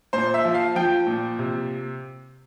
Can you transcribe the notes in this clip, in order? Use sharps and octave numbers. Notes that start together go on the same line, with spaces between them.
A#2 C5
E5
F3
F5
F3 G5
A#2
C3